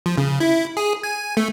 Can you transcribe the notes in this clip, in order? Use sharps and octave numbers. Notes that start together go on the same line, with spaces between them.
F3
C#3
E4
G#4
G#5
A3